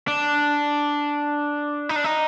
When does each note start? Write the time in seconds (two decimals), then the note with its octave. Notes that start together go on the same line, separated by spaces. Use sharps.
0.08 D4
1.89 D#4
1.96 D4
2.04 D#4